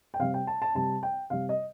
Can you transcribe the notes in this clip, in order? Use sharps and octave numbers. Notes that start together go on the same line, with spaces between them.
G5
C3 G3 F5
G5
A5
A5
C3 G3 A5
G5
C3 G3 F5
D#5